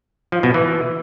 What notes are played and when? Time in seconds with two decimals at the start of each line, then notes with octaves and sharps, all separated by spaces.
0.32 F3
0.43 B2
0.54 E3